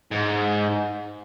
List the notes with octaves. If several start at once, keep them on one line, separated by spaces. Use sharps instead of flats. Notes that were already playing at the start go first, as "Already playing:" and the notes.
G#2